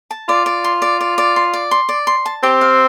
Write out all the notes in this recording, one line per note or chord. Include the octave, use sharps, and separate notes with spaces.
A5
F4 D5
D5
C6
D5
D5
D5
C6
D5
C6
D5
C6
A5
C4 G4
F5